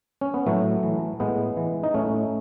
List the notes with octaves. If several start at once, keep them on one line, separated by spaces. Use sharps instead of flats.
C#4
B3
A2 F#3 A3
E3
A2 G#3 B3
E3
D#4
A2 A3 C#4